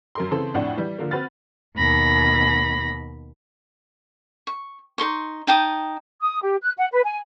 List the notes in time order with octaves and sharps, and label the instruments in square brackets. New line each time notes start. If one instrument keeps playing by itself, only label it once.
[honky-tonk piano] F#2 A#4 C6
C#3 E3 C4 A4 C6
F2 A2 D4 F#5
E3 G3
D3 F3 A#3
C4 F#4 B4 F6 A6
[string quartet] D#2 B2 B5 A#6
[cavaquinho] C#6
D#4 A#4 C6 C#6
D#4 G5 A5 D#6
[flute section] D#6
G4
F#6
F#5
B4
G#5